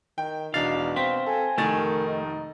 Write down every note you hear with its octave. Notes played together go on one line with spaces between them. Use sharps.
D#3 G5
E1 B2 D4 D#4 F5 A6
C4 F5 B6
A4 G#5
F1 D#3 A3 A#4 A6
D#4